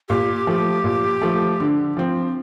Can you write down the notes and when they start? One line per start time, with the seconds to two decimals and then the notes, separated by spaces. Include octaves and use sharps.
0.09 A#2 G4
0.47 F3 A3
0.84 A#2
1.22 F3 A3
1.60 D3
1.97 F3 C4